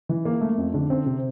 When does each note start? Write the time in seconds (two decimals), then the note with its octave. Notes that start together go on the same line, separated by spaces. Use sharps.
0.09 E3
0.25 A#3
0.41 A3
0.58 F2
0.74 D3
0.90 C4
1.06 C3